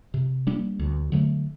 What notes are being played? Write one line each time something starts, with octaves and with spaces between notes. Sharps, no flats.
C3
G3 A#3 D4
D2
D3 F#3 A3